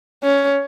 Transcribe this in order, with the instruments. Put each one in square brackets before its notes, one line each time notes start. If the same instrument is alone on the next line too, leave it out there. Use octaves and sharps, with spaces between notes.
[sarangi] C#4